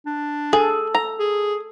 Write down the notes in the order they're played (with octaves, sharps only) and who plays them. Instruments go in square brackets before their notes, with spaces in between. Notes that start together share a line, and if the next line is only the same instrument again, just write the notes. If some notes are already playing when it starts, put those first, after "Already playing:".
[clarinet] D4
[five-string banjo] G#4 [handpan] A4
[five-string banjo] A#5
[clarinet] G#4